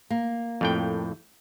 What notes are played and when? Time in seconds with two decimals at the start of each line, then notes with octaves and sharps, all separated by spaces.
0.10 A#3
0.61 F2 A2 G5